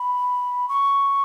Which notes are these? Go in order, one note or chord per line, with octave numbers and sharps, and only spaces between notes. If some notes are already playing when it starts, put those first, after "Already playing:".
Already playing: B5
C#6